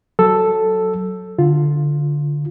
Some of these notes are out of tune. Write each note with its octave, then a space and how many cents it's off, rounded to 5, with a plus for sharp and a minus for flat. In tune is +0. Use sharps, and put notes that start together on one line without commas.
F#3 +0 A4 +0 E6 +5
D3 +0 F4 +0